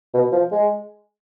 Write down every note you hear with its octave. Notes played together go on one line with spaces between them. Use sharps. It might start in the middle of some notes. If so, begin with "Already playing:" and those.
B2
F3
G#3